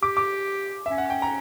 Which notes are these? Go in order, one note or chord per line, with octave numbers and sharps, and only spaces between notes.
G4 D6
D6
C#4 E5
F#5
G5
A#5